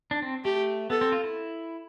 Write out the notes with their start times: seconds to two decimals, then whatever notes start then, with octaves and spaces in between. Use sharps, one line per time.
0.11 D4
0.22 C4
0.44 A3 G4
0.90 B3 A4
1.01 C4
1.12 F4
1.24 E4